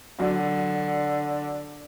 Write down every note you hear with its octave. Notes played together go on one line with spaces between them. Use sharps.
D3 F#3